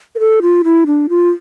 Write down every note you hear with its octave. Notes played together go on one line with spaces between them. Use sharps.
A#4
A4
F4
E4
D4
F4